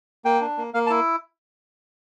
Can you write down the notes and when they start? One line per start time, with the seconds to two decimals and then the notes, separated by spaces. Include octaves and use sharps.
0.25 A#3 G5
0.41 D4
0.58 A#3
0.74 A#3 F5
0.86 A5
0.90 E4